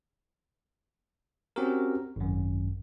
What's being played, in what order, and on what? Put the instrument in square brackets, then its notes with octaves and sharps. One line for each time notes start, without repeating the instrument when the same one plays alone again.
[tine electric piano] C4 C#4 F#4 G4 A#4
G#1 F#2